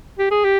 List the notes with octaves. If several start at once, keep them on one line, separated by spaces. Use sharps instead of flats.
G4
G#4
G4